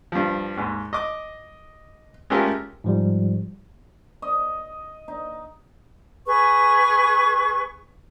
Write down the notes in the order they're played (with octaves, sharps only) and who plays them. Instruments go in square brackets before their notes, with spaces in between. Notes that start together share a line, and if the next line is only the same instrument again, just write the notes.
[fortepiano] G2 F3
D#2 G#2
D#5 D6
G#3 A3 C#4 F4 G4 A#4
[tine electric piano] G#2 F3 G3
[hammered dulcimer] D#5
D#4
[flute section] G#4 B4 C#6